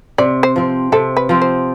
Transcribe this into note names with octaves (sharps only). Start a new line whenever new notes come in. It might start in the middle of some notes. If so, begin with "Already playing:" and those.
C3 D5
C5
F3 C4
C3 A4
B4
F3 C4
C5